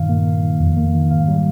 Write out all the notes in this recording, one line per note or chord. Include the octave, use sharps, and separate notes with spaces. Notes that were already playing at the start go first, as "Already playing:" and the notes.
Already playing: G2 A#2 D#3 F5
A#3
A#3
D#3
F2
A#3
D#3
G#2 F5
G3